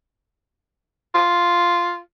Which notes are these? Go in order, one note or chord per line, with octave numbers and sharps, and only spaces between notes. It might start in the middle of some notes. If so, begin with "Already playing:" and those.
F4